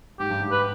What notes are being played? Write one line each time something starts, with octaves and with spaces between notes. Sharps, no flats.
G#2 G4
G2
G#2
B4